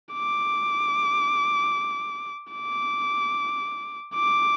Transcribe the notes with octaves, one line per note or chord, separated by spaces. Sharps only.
D6
D6
D6